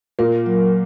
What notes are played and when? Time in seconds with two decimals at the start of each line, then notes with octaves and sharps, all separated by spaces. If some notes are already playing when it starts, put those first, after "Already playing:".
0.19 A#2 A#3 A#4
0.46 F#3